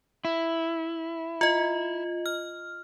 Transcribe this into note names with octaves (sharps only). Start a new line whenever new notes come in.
E4
F4 D#5
F6